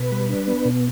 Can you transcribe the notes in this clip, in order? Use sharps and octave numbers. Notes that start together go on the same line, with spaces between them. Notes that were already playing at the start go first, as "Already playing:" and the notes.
Already playing: B2 B4
G3
D4
B3
B2